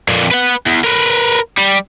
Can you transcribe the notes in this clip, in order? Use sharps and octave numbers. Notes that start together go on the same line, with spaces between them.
F2 A#2
B4 F#5
E2
A#4 B4
G3